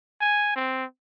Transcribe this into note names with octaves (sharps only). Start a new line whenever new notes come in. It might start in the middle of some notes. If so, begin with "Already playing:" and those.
G#5
C4